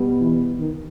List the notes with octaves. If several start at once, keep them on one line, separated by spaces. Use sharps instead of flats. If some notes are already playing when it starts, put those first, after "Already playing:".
Already playing: B2 G3 B3
E3
D#3